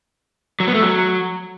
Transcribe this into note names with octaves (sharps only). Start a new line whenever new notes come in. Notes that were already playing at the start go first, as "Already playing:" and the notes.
F#3
B3
A3
F#3